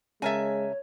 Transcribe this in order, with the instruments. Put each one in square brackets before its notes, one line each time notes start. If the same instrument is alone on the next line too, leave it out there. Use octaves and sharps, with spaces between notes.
[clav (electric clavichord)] C#3 A#4 A5 [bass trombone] G#3 [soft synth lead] C#5 [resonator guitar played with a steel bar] E5 G#5